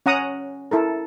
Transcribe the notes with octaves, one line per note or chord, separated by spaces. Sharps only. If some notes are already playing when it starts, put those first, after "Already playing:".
C#4 F#5 A#5 D#6
E4 A4 A#4